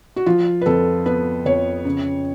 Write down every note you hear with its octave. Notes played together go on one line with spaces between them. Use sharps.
F#4
F3 F4
B4
F2 A4
B3 B4
F2 C#5
C#3